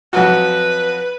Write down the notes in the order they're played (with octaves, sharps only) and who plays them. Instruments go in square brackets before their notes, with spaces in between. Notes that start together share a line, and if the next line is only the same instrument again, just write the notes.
[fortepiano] F2 F#3 F#4 [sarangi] B4